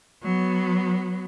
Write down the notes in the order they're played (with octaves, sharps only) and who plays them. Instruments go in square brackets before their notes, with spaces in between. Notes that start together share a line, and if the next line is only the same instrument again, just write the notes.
[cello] F#3 B3